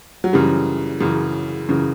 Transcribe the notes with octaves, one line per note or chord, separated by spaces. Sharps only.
F#3
F#2 C#3 E3 G3
F#2 C#3 E3
F#2 C#3 E3